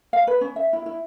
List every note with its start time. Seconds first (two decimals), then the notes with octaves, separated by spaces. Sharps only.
0.13 F5
0.27 B4
0.41 C#4
0.56 E5
0.73 E4
0.86 E4